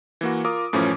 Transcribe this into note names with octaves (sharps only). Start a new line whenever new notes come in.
E3 A#3 F#4
F4 A#4 D6 D#6
F#2 A2 E3 F3 C#4